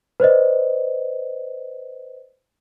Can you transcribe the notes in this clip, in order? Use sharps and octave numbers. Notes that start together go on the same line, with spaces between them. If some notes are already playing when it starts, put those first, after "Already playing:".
B4 C5 D5 D#5